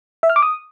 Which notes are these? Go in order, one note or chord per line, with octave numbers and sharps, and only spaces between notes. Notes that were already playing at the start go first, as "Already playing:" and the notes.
E5
F6
D6
D#6